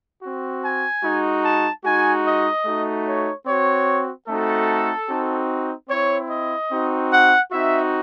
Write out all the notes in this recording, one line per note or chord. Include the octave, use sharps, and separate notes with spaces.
C4 F#4
G#5
G#3 D#4 F#4
A5
G#3 D#4 F#4 G#5
D#5
A3 D#4 F#4
C#5
C4 F#4 C#5
A3 C4 D#4 F#4 A4
C4 D#4 F#4
C4 E4 C#5
D#5
C4 D#4 F#4
F#5
C4 D#4 F#4 E5